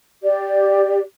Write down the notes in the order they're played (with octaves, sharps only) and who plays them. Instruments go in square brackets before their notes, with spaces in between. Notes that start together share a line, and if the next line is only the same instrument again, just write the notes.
[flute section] G4 D5